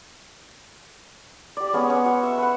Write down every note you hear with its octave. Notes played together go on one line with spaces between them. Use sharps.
G4 D5
G#3 B3 C#4
C#4 F#5
F#4
E5
B4 F#5